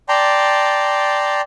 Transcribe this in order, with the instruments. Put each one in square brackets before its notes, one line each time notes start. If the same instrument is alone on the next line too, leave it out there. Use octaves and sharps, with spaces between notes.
[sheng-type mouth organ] D5 G5 A5 A#5 C6